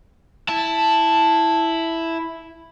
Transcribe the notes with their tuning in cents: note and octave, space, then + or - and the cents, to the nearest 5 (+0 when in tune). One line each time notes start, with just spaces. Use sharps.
E4 +0 A5 +0